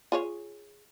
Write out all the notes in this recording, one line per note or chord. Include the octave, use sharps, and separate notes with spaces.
F4 G#4 C#5